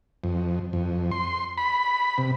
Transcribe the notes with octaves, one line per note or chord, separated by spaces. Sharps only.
F2
F2
C6
B5
C3